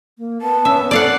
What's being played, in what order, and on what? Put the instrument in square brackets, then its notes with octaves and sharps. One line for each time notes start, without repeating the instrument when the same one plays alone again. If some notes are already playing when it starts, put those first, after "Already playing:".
[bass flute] A#3
[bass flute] B3 [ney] A5
[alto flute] C#4 [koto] E5
[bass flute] C4 [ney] A4 [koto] D5 F5 F#5